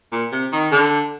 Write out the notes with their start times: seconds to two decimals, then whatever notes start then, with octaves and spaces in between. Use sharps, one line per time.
0.12 A#2
0.32 C3
0.52 D#3
0.72 D3